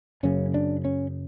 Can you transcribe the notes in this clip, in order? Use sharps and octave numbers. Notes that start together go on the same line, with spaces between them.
F#1 F#2 C#3 C#4
D4
C#4